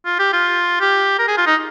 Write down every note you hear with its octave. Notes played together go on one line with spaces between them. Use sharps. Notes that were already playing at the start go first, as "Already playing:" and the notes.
F4
G4
F4
G4
A#4
G#4
F4
D#4